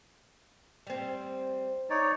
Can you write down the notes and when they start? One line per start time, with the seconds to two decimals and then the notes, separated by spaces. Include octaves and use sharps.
0.87 G3 C4
1.90 D#4 C#5 D5